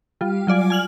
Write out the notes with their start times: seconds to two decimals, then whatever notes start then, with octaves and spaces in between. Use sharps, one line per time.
0.21 G3 F4
0.47 F#3 F4 D5 G#5
0.70 G#5 F6 F#7